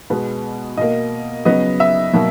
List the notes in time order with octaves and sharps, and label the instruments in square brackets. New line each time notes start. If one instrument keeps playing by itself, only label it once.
[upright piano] B2 G#3 B3
B2 A#3 D#5
C#3 F#3 B3 D#5
E5
B2 F#3 A#3